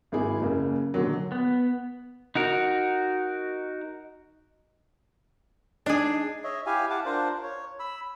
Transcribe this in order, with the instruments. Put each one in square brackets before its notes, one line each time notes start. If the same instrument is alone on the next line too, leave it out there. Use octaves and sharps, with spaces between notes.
[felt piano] G#1 A#3 E4 G#4
F#1 C#3 A#3
A#1 D3 D#3 F#3
[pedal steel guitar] B3
D#4 F#4 A#4
[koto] D4 G#4 [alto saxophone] D#4
[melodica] C#5 D#5 E5
E4 G4 F5 G#5
F5 F#5 A5 D6
D4 F4 A#4 C5
C#5
B5 E6